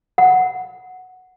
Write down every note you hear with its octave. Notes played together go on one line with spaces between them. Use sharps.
F#5